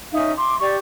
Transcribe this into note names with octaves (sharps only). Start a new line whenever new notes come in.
C#4 D#4 E5 F5
C6 D6
G4 D5 C#6